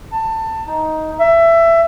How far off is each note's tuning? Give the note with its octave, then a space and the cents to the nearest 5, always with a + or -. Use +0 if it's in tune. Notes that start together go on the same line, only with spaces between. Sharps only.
A5 +20
D#4 +10
E5 +20